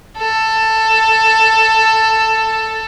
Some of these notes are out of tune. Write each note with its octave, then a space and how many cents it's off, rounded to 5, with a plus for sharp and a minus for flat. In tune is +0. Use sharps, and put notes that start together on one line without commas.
A4 +10